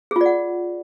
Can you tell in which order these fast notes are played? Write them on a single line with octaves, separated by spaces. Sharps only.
G#4 F4 D5 F#5